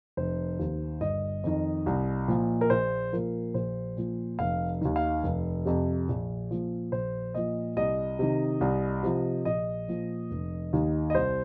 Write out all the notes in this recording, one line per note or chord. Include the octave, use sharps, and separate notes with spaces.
F1 C5
D#2 D#3
G1 D#5
F2 D#3
C2
A#2 F3
A#4
A#1 C5
A#2 F3 A#4
A#1 C5
A#2 F3
F1 F5
D#2 D#3
F5
F1
F2 C3
A#1
A#2 F3
A#1 C5
A#2 F3 D#5
C2 D#5
C3 D#3
C2
C3 F3
A#1 D#5
A#2 F3
F1
D#2 D#3
D#5
C2 C5